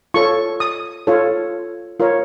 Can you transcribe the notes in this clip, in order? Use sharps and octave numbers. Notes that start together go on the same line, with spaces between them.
F4 A4 C#5 C#6
D#6
F4 A4 C#5
F4 A#4 C#5